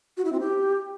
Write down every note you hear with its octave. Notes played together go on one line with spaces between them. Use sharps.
F#4
E4
C4
G4